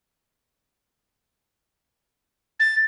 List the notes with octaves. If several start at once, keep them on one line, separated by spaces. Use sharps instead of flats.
A6